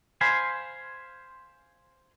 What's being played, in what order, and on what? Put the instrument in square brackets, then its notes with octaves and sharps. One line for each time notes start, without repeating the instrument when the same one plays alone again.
[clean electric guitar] C5 F5 G#5 B5 C6